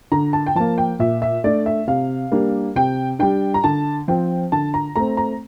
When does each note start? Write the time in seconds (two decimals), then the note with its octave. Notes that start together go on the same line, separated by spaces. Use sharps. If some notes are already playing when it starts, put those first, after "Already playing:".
0.12 D3 A#5
0.33 A5
0.46 G5
0.55 F3 A#3 A5
0.78 G5
0.99 A#2 E5
1.22 E5
1.44 A3 D4 D5
1.66 E5
1.87 C3 F5
2.32 G3 A#3 D4
2.75 C3 G5
3.19 G3 D4 G5
3.54 A#5
3.64 D3 A5
4.08 F3 C4 G5
4.52 D3 A5
4.74 A#5
4.96 A3 C4 A#5
5.17 A#5